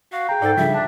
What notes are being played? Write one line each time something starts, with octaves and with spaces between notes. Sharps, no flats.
F#4 F5
G#4 G5 A#5
G#2 A4 D5 A6
C#3 F3 G3 D4 E5
D4 A5